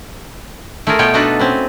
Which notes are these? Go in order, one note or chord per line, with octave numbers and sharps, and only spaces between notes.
A3 E4 F4 G#4 A#4
B2 B3 F4 C#5 G5
D4 D#4 F4 F#4 A4 B4
C4 C#4 B4